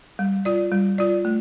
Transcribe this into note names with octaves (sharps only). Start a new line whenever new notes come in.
G3
F4 D5
G3
F4 D5
A3